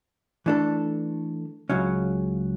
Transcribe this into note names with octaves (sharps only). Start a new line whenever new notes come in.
E3 A3 D4 A4
C#2 C#3 F#3 C#4